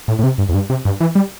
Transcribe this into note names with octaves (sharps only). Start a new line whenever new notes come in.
A2
A2
C3
G2
E2
G2
C3
G2
E3
G3